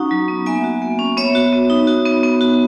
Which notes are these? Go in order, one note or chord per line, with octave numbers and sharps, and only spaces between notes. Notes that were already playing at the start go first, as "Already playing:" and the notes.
Already playing: C#4 D#4 F#4 F#5 A#5
F#3
B3
A#3 E5 G#5
F#4
A#3
C#4
B3 C#5 E5
F#4
B3
D#4
F#4
B3
B3
F#4